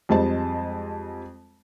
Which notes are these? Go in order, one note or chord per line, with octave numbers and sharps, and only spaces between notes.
F2 G3 G#3 C5 D#5 A5